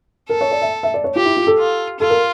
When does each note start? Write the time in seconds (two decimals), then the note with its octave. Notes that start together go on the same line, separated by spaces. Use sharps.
0.29 A4 A#4
0.41 C#5
0.51 D5
0.62 E5
0.83 E5
0.94 D5
1.04 C#5
1.15 F4 G4
1.25 E4
1.37 F4
1.47 A4
1.58 F4
2.00 F4 A4
2.10 A#4